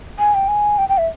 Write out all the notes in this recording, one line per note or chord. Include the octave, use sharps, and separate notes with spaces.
G#5
G5
G#5
G5
G5
E5